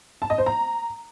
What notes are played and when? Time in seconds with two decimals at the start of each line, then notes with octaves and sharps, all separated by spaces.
0.22 A5
0.30 D#5
0.38 C5
0.46 A#5